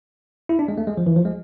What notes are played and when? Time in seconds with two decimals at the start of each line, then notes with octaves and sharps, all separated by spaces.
0.49 E4
0.59 D4
0.68 G#3
0.78 A3
0.87 G#3
0.97 F3
1.06 E3
1.16 F3
1.25 G#3